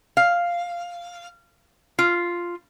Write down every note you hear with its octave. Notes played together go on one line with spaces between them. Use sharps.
F5
F4